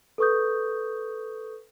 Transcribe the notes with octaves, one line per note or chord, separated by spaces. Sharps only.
A4 B4 C#6 D#6 G6